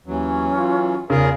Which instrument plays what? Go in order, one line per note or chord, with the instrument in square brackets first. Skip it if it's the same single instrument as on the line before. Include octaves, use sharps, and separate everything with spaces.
[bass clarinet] D#2 [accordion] E3 F#3 [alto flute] C#4
[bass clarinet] F4
[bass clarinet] E2 [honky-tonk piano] C#3 [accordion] F4 G#4 A#4